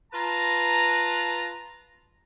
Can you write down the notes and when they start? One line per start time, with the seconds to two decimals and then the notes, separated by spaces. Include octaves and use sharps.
0.13 F4 B4 A5 A#5